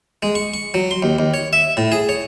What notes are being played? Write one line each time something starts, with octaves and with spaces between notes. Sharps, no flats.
G#3
C#6
C#6
F#3
C6
D#2
D#2
C#5
E5
A2
G#4
C#5